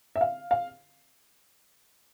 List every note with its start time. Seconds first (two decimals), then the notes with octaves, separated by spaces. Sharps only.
0.16 E5
0.21 F5
0.51 F5